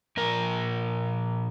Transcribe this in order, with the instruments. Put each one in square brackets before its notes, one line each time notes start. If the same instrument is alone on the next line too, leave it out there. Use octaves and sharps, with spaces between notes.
[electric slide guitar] A#2 F3 A#4